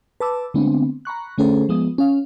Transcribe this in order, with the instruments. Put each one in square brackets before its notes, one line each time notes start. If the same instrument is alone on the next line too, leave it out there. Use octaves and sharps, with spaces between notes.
[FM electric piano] B4 A5 D6 E6
D3 G#3 A3 B3 C4 D4
A#5 B5 C#6 F#6
D3 A3 C#4 G#4 A4 C5
F3 G#3 B3 D#6
C#4 F5